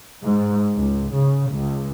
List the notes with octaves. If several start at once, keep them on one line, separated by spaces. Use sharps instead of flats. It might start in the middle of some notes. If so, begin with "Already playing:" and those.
G#2
C#2
C#3
C#2